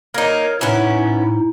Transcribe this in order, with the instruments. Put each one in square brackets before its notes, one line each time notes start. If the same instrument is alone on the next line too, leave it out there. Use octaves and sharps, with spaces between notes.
[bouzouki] A#3 D#4 [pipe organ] A#4 C#5
[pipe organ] A2 D#4 [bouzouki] B3 C#4 E4